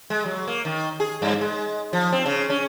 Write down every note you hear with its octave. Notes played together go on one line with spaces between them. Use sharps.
G#3
F#3
A#3
D#3
G#4
G2
G#3
F3
C4
C#3
C#4